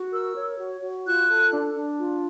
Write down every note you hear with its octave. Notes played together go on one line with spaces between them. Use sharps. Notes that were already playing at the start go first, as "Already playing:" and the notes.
Already playing: F#4
A#4 E6
C#5
F#4
F#4
F4 F#6
A4
D4
D4
F4